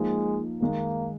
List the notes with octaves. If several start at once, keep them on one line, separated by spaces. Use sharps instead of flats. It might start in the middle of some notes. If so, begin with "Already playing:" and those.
Already playing: F3 G#3 A#3 D#4
D#3 G#3 A#3 D#4